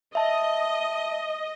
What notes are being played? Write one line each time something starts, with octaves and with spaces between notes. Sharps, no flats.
D#5 E5 A5